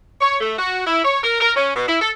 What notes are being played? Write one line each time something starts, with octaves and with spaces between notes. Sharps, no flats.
C#5
A3
F#4
E4
C#5
A#4
A#4
C#4
B2
E4
A4